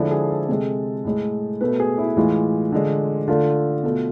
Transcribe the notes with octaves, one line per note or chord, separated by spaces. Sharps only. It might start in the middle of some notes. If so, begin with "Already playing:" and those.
Already playing: D3 F3 G#3 E4
G#4
A4
C3 G#3 A4
A2 G#3
B2 A3 B4
G#4
E4
A2 E3 G#3 F4
D3 G#3
D3 A3 F4
B2 A3